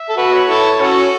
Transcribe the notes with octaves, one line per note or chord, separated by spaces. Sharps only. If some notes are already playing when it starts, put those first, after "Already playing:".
Already playing: E5
A4
F#4 B4
C#5
E4 A4
C#4 F#4 A4